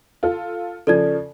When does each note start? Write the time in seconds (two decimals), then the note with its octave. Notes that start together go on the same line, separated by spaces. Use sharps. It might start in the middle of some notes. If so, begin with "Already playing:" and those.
0.23 F4 A4
0.87 C#3 F3 A4 D5 G#6